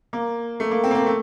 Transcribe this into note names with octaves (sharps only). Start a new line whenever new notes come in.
A#3
A3
A#3
C4
A#3
C4
A3